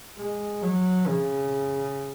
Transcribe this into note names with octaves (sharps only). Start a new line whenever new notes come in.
G#3
F#3
C#3